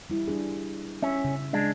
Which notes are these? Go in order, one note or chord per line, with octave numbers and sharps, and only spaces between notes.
G3 E4
G3 D4 G#4
C#4 E5
C#3
G#3 D4